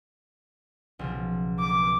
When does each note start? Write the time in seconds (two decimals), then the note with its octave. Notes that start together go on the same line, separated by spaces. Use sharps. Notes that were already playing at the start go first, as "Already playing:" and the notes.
0.99 B1 C#3 F3
1.59 D6